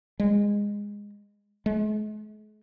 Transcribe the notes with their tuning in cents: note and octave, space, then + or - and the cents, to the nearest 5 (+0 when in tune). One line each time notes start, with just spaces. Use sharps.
G#3 -15
G#3 +45